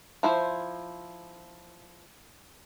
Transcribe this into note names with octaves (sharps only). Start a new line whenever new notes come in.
F3 E4 C5